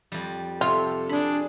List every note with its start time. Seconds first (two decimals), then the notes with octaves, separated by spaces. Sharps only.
0.12 F2 G3
0.61 C3 F4 A4 C5 C#5
1.09 D4 G#4 B5